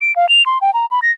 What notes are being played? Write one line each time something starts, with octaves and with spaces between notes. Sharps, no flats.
D7
F5
F7
C6
G5
A#5
B5
A#6